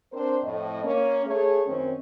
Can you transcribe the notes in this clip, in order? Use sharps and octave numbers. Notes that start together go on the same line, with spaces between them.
C4 D4 A#4 C5
F2 A2 D#5
A#3 C#4
A3 G#4 C#5
F#2 D#3 C4 C#4